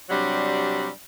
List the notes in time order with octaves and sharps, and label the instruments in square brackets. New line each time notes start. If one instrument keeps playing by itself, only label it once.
[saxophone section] C3 F#3 G3 D4